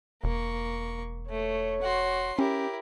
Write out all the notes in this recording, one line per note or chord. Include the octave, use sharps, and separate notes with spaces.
E1 A#3 C#6
A3 C#5
F#4 C6
C#4 E4 G4 A#4